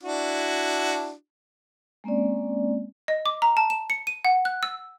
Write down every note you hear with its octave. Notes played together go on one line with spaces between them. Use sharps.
D4 E4 F#4
G#3 A#3 C4 C#4 D5
D#5
D6
A#5
A5
E7
C#7
D#7
F#5
F#6
E6